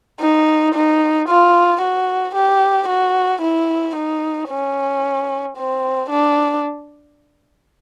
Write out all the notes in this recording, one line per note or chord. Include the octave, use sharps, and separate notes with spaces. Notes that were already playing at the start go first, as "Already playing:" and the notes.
D#4
D#4
F4
F#4
G4
F#4
E4
D#4
C#4
C4
D4